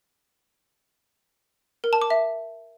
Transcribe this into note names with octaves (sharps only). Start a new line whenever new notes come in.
A#4
A5
D6
E5